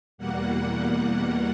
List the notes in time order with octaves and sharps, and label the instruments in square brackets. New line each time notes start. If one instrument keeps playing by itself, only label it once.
[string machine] E2 B2 G3 A#3 F#5